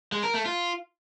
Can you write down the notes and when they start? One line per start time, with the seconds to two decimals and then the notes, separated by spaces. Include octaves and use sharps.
0.12 G#3
0.23 A#4
0.34 A3
0.46 F4